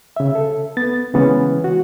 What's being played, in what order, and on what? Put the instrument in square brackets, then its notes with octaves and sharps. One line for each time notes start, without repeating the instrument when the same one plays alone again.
[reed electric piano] C#3 E5
A4
B3 A6
C#3 E3 G#3 B3 C#4
F#4